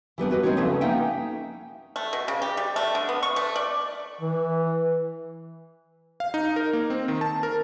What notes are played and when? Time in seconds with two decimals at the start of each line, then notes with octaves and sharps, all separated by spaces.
0.18 E3 G3 B3 D4
0.31 F#4 B4 D#5
0.43 G#3 C4 D4 D#4 C#5
0.56 C#3 F3 A3 B3 C#4
0.81 A#3 C#4 D#4 E5 F#5 G5
1.96 A3
2.13 B2
2.28 C#3
2.42 G4
2.57 G3
2.76 A3
2.95 D3
3.09 B3
3.23 C#6
3.36 A3
3.56 D5
4.21 E3
6.20 F5
6.34 D#4
6.56 A#4
6.73 A#3
6.90 C4
7.08 D#3
7.21 A5
7.43 A#4